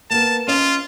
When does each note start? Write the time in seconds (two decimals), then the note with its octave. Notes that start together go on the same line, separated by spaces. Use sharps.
0.10 A#3 B3 A#4 A5
0.48 C#4 F4 D#5